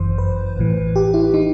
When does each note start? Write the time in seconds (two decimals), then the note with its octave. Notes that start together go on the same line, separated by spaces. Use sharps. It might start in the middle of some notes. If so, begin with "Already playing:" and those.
Already playing: G1 F#2 E3 C5
0.18 B4
0.57 A1 A2 E3
0.96 G4
1.14 E4
1.33 E3 D#4